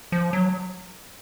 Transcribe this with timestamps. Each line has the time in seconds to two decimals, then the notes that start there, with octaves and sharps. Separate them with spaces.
0.12 F3
0.33 F#3